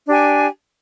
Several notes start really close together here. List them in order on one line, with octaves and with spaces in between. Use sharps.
D4 G4 G#5